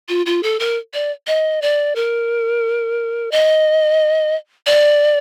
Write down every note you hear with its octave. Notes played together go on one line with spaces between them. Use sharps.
F4
F4
A4
A#4
D5
D#5
D5
A#4
D#5
D5